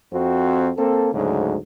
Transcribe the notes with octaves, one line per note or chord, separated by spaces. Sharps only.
F2 C4 F#4
A#3 C4 A4
D2 G#2 C#3 F#3